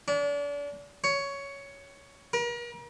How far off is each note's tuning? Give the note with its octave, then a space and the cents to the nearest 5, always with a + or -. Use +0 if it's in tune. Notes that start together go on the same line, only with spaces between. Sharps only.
D4 -35
C#5 +10
A#4 +40